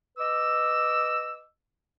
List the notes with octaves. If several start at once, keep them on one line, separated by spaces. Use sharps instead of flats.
B4 D#5 D6 E6